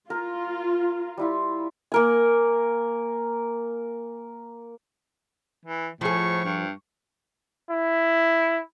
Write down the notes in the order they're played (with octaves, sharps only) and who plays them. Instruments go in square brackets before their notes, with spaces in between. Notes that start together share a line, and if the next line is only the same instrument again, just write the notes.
[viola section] F4 [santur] A#4 A#5
[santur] G3 E4 F4
A#3 A#4 G#5
[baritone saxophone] E3
[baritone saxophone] A2 [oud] F3 G#4 [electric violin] C#6
[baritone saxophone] G2
[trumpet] E4